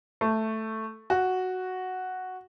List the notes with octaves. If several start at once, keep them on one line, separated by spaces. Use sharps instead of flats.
A3
F#4